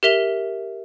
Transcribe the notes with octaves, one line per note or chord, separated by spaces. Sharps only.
G4 A#4 E5 F7 G7